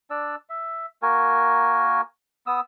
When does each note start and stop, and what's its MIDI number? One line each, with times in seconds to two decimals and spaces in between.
0.10 0.36 62
0.10 0.36 74
0.10 0.36 88
0.49 0.86 76
1.02 2.01 58
1.02 2.01 66
1.02 2.01 70
1.02 2.01 80
2.47 2.60 59
2.47 2.60 87
2.47 2.60 88